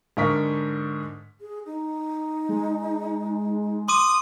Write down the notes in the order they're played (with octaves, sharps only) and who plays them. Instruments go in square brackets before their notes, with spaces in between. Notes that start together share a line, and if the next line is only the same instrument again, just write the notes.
[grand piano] G#2 D3 A#4 D#5 C#6 B6
[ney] G#4
D#4
[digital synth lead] G#3
[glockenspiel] C6 D6 D#7 [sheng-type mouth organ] D#6